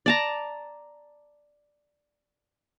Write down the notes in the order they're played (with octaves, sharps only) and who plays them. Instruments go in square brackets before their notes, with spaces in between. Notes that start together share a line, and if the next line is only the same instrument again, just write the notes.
[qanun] D5 A5 A#5